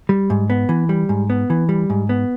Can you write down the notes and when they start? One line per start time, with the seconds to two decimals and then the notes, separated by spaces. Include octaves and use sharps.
0.09 G3
0.30 G#2
0.50 B3
0.69 E3
0.89 G3
1.09 G#2
1.30 B3
1.50 E3
1.69 G3
1.90 G#2
2.09 B3